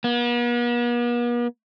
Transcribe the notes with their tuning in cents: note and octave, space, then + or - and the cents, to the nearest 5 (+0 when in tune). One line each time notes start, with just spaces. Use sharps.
B3 -45